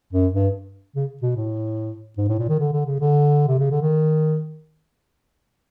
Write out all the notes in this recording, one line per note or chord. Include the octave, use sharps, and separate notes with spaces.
F#2
G2
C#3
B2
A2
G#2
A2
A#2
D#3
D3
D3
C#3
D3
C3
C#3
D3
D#3